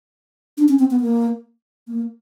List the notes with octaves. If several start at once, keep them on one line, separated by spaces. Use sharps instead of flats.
D4
C#4
C4
B3
A#3
A#3